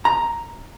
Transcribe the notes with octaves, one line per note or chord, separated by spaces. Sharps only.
A#5